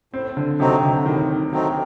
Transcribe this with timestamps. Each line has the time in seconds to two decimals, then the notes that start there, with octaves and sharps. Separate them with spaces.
0.13 A2 C4
0.37 D3
0.60 C3 F#3 A3 C4 D#4
0.83 D3
1.05 A2 D#3
1.52 F#3 A3 C4 D#4